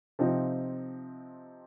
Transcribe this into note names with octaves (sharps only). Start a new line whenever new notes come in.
C3 F3 C4 D#4